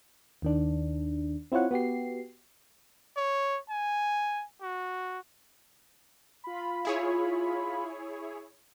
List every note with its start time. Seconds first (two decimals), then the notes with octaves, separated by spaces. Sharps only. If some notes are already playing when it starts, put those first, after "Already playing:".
0.42 D#2 D#3 D4
1.52 C4 E4 F4 C#5 F#5
1.71 B3 F#4 G4 C7
3.17 C#5
3.70 G#5
4.62 F#4
6.44 F4 B5
6.85 E4 G#4 C#5